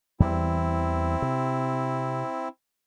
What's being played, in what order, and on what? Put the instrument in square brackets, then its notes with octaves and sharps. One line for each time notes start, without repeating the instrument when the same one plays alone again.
[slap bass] E2 E3 G3 [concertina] C4 E4
[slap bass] C3